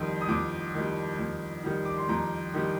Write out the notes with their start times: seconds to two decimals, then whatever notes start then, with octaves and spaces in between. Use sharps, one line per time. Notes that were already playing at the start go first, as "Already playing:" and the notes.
Already playing: F2 D#3 G3
0.21 D#6
0.29 F2 D6
0.74 D#3 G3
1.19 F2
1.64 D#3 G3
1.85 D6
1.97 C6
2.09 F2 A#5
2.54 D#3 G3